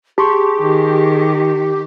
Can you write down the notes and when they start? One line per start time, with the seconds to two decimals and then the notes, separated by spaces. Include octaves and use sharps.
0.18 G4 G#4 A5 C6 C#6
0.59 D#3